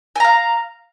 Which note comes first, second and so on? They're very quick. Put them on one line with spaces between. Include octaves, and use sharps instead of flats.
G#5 A#5 F5